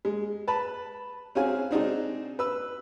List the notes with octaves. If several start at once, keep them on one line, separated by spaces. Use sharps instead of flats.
G#3
B4 A5 B5
C4 C#4 F#4 G#4 F5 G#5
C4 D4 D#4 F#4 G#4
B4 E6